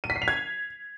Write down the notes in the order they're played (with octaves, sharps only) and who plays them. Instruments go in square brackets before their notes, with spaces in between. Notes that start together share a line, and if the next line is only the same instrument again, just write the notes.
[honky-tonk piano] D#7
B6
C7
F7
G#6